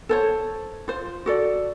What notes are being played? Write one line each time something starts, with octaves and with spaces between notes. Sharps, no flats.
A4 C5 C#5
F4 C5
F#4 A4 D5